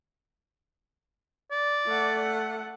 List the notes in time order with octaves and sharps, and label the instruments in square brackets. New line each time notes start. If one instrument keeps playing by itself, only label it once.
[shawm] D5
[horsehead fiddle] A3 F#5